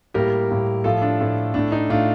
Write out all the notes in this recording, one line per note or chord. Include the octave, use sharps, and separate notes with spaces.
A2 G3 A#3 G4 A#4
A2 G3 A#3
A2 F3 A3 F4 A4
D4 F4
A2 F3 A3
A2 A3 D4
D#4
A2 A3 D4 F4